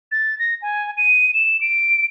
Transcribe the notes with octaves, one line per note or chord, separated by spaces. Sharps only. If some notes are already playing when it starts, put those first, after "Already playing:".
A6
A#6
G#5
D#7
E7
D7